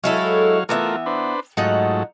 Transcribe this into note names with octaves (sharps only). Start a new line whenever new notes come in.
F#3 G#3 E4 A4 C#5 F5
E3 A3 B3 F4 A#4 E5
D4 B4 C5
G#2 F#3 A3 D#4 F4 F#5